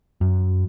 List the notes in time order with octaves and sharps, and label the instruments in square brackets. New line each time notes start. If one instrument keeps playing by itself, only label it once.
[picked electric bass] F#2